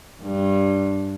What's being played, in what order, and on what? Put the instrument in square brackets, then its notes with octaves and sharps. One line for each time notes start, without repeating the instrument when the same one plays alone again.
[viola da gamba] G2